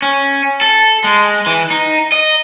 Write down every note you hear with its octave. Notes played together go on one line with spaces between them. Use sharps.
C#4
A4
G#3
E3
D#4
D#5